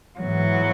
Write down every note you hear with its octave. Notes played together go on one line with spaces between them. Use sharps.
G#2 E3 F#3 B3